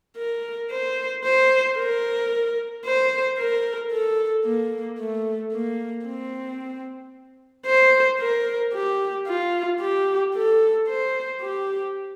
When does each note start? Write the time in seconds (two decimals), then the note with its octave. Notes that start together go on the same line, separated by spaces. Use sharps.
0.17 A#4
0.71 C5
1.24 C5
1.77 A#4
2.85 C5
3.38 A#4
3.92 A4
4.45 A#3
4.99 A3
5.52 A#3
6.05 C4
7.66 C5
8.20 A#4
8.74 G4
9.27 F4
9.81 G4
10.35 A4
10.88 C5
11.41 G4